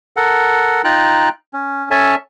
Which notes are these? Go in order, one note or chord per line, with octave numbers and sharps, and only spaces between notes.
A4 A#4 F#5
D#4 F4 G5 A#5 F#6
C#4
C#4 A4 C#5 E5 G#5 A5